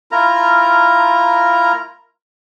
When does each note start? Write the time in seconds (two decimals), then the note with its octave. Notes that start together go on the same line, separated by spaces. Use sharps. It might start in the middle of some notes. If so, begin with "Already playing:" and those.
0.12 E4 F4 A#4 A#5